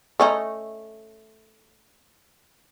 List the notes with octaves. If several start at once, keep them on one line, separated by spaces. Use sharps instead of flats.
A3 C#4 D#4